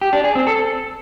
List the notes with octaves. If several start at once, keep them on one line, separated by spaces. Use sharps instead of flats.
G4
D4
G#4
C4
A4